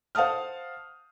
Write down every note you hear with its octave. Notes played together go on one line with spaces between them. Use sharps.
C5 F5 F#5 A5 D#6 F6